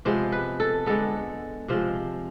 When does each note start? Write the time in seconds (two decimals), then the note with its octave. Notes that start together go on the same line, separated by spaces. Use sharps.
0.05 C3 F3 G#3 B3 C5
0.32 B4
0.60 A4
0.86 D3 G#3 B3 A4
1.68 C3 F3 G#3 C5